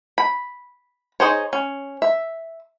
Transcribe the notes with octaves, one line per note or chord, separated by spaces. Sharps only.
B5
D#4 G#4 C5 C#5
C#4
E5